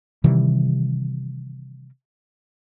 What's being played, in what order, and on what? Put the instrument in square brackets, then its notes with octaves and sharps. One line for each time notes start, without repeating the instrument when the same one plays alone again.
[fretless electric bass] C3 D#3 E3 G3